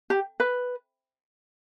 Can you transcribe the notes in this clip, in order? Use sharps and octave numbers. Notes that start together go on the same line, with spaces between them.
G4
B4